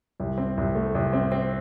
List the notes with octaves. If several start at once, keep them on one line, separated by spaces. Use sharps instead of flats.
C2
C4
C2
A3
C2
C4
C4